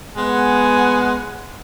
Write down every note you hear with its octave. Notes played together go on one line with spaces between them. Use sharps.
G#3 B3 F#5 G#5